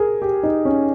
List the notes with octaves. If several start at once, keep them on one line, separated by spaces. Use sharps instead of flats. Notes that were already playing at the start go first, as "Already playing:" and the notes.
Already playing: G#4 A#4
G4
D#4
C#4